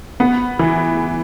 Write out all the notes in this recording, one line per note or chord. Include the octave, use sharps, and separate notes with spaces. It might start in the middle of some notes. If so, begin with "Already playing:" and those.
B3
E3